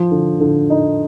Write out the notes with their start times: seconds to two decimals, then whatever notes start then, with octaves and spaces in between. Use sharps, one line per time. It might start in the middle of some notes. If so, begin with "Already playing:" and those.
Already playing: F3
0.11 D3
0.40 D3
0.70 D#4